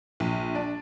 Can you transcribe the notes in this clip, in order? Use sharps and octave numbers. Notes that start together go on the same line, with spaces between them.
A#1
D4